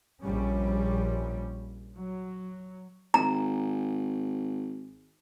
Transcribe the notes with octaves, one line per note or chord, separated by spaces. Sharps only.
A#1 G3 C#4
F#3
G#1 A#5